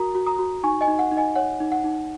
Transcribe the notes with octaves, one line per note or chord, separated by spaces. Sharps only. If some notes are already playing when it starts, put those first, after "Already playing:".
Already playing: F#4 A#4 A#5 D#6
F#4
A#5 D#6
F#4
D#4 G#5 C#6
D#5 G#5
D#4
F#5
D#4
D#5 G#5
C#5 F#5
D#4
F#5
D#4